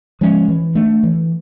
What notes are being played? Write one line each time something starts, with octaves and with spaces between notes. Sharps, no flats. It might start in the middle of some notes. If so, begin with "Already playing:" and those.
F3 G#3 C#4
E3
A3 D4
E3